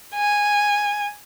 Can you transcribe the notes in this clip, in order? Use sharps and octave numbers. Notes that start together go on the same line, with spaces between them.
G#5